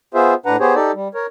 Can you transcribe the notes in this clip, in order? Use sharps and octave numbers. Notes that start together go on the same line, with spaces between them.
B3 F4 G#4 C5 E5
A2 D4 B4 F#5 A#5
B3 G4 G#4 C5 C#5
D#4 G4 A4 D5
G3
A#4 C#5